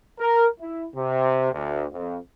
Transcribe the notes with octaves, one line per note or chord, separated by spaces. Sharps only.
A#4
E4
C3
D2
F2